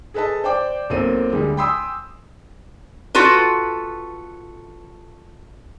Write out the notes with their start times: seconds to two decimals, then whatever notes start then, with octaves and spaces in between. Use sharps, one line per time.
0.14 G#4 A4 B4 D#5 A5
0.44 C5 D5 G5 D6
0.90 B1 A#3 C4 A4 D#7
1.32 D2 G3 G#3
1.57 G5 G#5 B5 C6 D#6 E6
3.15 F4 F#4 A4 B4